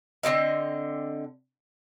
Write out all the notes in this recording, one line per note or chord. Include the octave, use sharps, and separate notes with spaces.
D3 C4 E4 D#5